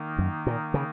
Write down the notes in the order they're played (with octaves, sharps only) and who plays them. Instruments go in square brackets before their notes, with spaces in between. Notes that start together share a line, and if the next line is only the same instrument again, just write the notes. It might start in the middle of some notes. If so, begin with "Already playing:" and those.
Already playing: [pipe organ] D#3 A#3 D#4
[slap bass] F#2
A#2
C#3